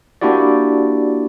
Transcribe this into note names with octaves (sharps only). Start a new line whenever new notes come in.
A#3 D4 E4 F#4 G4 D5